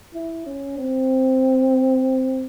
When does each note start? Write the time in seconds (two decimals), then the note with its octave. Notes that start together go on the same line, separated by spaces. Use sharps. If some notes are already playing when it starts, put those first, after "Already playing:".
0.14 E4
0.46 C#4
0.78 C4